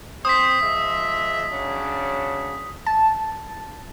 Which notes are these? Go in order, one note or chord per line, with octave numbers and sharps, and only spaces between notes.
C4 C5 D#6 B6
F3 G#3 E5
C#3 F#3 D4
A5